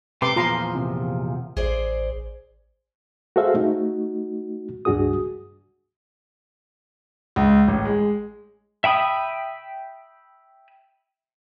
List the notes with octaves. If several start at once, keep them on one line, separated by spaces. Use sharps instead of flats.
C3 A3 B4 C6 D6
E2 A#2 F3 F4 A#5 C6
C3
A1 G#4 C5 D5
F#4 G#4 A4 C5 E5 F5
A3 D#4 F#4
C#2 G2 D4 F#4 G#4 D#6
C#2
A1
G#3
E5 G5 B5 D#6